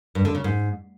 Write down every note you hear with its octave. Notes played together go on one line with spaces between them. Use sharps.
G2
D3
C#3
G#2